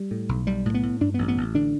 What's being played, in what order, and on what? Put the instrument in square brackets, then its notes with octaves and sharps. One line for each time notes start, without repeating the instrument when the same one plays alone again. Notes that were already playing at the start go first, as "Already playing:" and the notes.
Already playing: [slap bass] G3
A2
B1
B1 G3
A2
B3
A2
G2 D4
A1 B3
B3
A1
D3 D4